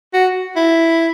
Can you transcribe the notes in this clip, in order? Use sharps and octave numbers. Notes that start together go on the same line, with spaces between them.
F#4
E4